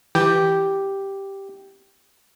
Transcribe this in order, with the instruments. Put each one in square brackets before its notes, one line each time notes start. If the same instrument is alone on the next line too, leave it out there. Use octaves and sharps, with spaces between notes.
[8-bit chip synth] E3 [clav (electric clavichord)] G4